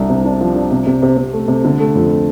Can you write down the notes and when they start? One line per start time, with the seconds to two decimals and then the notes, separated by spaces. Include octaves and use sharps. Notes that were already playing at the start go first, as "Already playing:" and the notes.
Already playing: C2 D4
0.09 C3
0.25 D4
0.41 F3
0.56 D4
0.71 C3
0.86 C3
1.02 C3
1.17 C3
1.33 A3
1.48 C3
1.65 D3
1.80 A3
1.95 F2